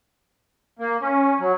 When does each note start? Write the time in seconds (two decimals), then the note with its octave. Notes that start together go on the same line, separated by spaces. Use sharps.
0.79 A#3
1.01 C#4
1.39 F#3